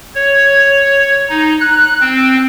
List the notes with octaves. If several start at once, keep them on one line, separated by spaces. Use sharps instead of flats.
C#5
D#4
F#6
C4